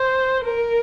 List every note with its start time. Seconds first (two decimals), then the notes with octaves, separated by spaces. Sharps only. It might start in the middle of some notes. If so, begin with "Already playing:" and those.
Already playing: C5
0.45 A#4